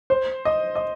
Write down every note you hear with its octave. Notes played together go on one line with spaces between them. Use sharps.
C5
D#5
D#5